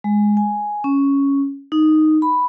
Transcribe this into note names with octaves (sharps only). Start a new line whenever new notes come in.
G#3
G#5
C#4
D#4
B5